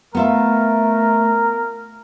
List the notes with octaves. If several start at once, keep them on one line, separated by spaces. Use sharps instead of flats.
A3 B3 F4 A#4 E5